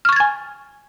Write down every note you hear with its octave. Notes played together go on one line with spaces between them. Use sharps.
G#5 C#6 F6 G#6 A6